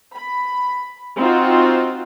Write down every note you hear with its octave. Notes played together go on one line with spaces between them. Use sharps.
B5
C4 D#4 F4 F#4 C5